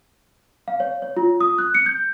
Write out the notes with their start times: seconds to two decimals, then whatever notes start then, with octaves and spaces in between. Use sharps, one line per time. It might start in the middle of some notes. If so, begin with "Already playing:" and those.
0.68 F5
0.80 C#5
1.02 C#5
1.17 F4
1.41 D#6
1.58 F#6
1.74 C#7
1.86 G6